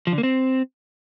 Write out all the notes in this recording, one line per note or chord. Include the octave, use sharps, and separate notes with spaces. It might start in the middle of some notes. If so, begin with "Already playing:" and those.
F3
D3
A#3
C4